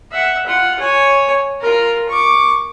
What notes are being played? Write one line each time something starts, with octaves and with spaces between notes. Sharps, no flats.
E5 F#5
F4 F#5
C#5 G#5
F4 A#4
C#6 D6